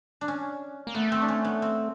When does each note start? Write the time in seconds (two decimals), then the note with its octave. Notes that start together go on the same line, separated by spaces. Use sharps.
0.21 D4
0.28 C#4
0.87 A#3
0.94 A3 B3
1.12 C4
1.21 D4
1.28 C#4
1.44 B3
1.62 C4